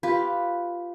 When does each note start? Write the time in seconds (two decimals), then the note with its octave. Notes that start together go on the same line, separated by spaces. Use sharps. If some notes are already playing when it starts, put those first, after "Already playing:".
0.03 F4 G4 B4